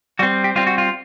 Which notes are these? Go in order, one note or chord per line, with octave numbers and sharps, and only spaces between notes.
G3 C4 F#4
G4
G3 C4 F4
F#4
F4